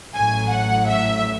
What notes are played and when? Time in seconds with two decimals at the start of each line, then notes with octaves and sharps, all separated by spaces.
0.14 A1 A2 F#3 G#5
0.50 F#5
0.87 E5